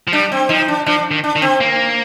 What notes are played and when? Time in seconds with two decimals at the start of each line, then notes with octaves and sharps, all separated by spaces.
0.07 F3
0.12 G3 D4
0.32 C4
0.49 F3 D#4
0.68 D4
0.86 F3 D4
1.11 D#3
1.24 D4
1.36 D#3
1.42 C4
1.61 A#3